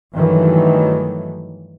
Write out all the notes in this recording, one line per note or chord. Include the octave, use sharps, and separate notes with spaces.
G2 D#3 E3 F#3 A3